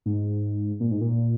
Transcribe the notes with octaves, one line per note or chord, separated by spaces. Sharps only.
G#2
A#2
G#2
A#2